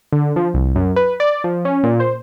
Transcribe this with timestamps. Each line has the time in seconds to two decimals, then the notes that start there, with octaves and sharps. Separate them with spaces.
0.12 D3
0.36 F3
0.54 C2
0.75 F#2
0.96 B4
1.20 D5
1.44 F3
1.65 C#4
1.84 A#2
2.00 C5